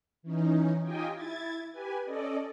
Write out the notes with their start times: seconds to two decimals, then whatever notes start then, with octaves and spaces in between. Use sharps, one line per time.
0.23 E3 C#4 D#4
0.83 D#4 F4 G4 D#5 G5 G#5
1.14 E4 G#6 A6
1.72 G4 B4 G#5
2.05 C#4 A4 D5 D#5